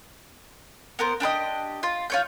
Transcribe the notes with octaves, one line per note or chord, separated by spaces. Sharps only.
B3 A#4 C5
D4 G4 B4 D#5
F4
F4 C#5 G6